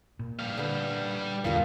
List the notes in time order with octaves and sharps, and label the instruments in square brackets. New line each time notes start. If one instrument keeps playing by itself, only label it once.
[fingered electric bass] A#2
[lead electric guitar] G3 F5
[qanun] D3 B4
[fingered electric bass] E2 A#2 D3 [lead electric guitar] G2 [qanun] A#3 F4 A4